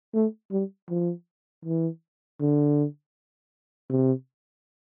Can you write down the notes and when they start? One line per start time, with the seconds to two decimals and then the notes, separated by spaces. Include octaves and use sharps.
0.14 A3
0.52 G3
0.89 F3
1.65 E3
2.40 D3
3.90 C3